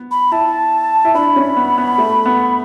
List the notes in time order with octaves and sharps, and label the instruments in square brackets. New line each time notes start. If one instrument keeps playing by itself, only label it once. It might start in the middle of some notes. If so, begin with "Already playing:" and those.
Already playing: [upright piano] B3
[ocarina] B5
[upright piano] E4 [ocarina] A5
[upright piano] E4
[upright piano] D4 [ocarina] B5
[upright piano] C#4
B3
B3
A3
B3